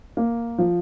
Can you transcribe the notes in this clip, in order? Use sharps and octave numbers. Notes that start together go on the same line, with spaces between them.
A#3
F3